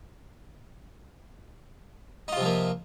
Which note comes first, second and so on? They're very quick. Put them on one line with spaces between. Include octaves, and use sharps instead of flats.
D#4 F4 C3 F3 A#3